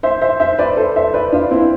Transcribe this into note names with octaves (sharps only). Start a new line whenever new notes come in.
C5 E5
C5 E5
C5 E5
B4 D5
A4 C5
C5 E5
B4 D5
D4 F4
C4 E4